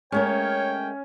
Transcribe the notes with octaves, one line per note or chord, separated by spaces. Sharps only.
G#3 A3 C#4 A#4 C#5 G5